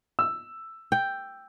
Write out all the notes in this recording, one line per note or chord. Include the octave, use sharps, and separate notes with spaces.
E6
G5